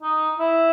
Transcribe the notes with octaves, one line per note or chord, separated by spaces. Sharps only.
D#4
E4